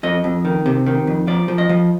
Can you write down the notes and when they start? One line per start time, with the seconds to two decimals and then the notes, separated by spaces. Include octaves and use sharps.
0.03 F2 D#5
0.24 F2
0.45 D#3
0.66 C3
0.86 D#3
1.07 F2
1.27 F3 D5
1.48 F3
1.58 D#5
1.69 F3